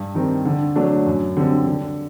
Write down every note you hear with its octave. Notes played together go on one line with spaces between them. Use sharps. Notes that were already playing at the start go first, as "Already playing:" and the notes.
Already playing: G2
D#3 G3 C4
D3
F#3 A3 D4
F#2
D3 G3 C4
D3